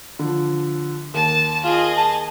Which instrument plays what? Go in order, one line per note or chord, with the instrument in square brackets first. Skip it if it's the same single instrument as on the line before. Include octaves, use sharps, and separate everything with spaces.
[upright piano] D3 F3
[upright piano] D#2 [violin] A5 E7
[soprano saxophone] F4 [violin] G#4 D#5
[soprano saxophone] A5